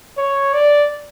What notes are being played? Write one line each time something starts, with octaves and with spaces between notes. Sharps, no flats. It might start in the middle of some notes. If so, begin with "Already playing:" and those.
C#5
D5